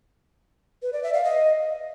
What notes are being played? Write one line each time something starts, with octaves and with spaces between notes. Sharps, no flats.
B4
D5
E5
F5
D#5